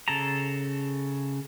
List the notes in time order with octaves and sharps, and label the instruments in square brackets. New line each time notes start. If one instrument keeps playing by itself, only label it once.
[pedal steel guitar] C#3 A4 A5 A#5